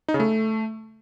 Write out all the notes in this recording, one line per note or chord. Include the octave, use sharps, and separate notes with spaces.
D#4
C#3
A3